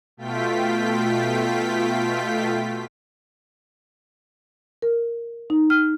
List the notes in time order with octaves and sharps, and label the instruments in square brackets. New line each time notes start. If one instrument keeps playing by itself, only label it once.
[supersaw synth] B2 A3 F4 G5 B6
[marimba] A#4
D#4
F6